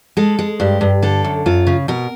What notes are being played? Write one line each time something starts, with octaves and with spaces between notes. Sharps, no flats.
G#3 A4
G#3
G2 G4
G2
D3 A4
F#2
F#2 F4
C#3
B2 A#4